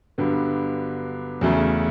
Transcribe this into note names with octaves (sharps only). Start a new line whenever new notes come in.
G2 D3 F#3 B3
E2 C#3 F#3 A3